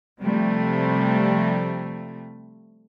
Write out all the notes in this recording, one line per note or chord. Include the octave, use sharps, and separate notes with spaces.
C3 F3 G3 A3